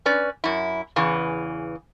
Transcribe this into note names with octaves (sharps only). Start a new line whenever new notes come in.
C#4 B4 D5
F#2 E4
E2 C#3 E3